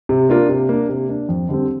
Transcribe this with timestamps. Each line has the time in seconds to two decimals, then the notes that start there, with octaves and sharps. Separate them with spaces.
0.09 C3
0.29 A#3 D4 F4 A#4
0.49 C3
0.69 A#3 D4
0.89 C3
1.09 A#3 D4
1.29 F2
1.49 D3 G3 C4